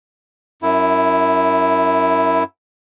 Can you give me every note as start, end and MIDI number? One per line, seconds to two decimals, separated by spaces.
0.62 2.43 42
0.62 2.43 64